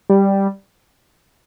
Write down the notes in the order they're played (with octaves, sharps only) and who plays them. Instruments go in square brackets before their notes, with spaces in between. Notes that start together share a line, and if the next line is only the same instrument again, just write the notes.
[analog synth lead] G3